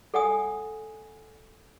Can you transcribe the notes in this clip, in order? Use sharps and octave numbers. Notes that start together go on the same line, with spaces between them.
A4 D5 F#5 G#5 D#6